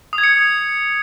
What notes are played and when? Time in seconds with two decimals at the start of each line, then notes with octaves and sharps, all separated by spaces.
0.13 D#6
0.18 G#6
0.24 C#7